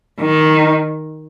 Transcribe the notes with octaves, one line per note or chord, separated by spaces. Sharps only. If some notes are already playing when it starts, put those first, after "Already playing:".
D#3